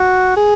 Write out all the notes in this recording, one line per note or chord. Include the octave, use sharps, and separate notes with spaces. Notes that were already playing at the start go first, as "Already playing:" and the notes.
Already playing: F#4
G#4